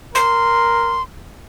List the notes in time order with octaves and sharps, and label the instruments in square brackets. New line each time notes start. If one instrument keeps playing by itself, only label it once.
[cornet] A#4 [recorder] C6